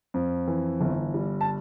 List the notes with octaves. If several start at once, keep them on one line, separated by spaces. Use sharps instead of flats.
F2
E3
G1
G3
A5